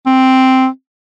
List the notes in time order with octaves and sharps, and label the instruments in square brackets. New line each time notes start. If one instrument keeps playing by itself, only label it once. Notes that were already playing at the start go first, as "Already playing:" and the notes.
[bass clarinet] C4